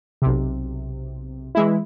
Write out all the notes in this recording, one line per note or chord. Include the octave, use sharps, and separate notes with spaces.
B1 C3
E3 G#3 E4